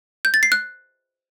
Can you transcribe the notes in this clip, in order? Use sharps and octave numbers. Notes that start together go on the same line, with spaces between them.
G6
A6
C7
F#6